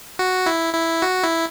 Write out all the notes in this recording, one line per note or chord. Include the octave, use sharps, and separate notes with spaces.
F#4
E4
E4
F#4
E4